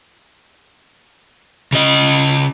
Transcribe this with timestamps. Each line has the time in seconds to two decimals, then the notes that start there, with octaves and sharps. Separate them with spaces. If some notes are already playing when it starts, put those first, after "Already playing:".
1.72 C#3 D#5